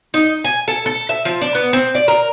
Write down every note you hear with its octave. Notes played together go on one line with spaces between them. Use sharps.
D#4
G#5
A4
A4
E5
F3
D4
B3
C4
D5
A#4